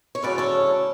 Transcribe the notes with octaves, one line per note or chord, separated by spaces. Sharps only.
C#5
D2 C#3 F#3 C#4 E4 B4 D5
A4 C#5